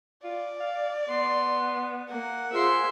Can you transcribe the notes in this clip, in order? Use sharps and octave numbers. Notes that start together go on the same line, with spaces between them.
F4 D5
F5
B3 C6
A#3 F#5
F4 G#4 A#4 C5 E5 C6